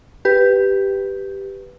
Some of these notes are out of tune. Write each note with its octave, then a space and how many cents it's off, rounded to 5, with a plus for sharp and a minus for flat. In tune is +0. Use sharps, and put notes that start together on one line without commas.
G4 +0 B4 +0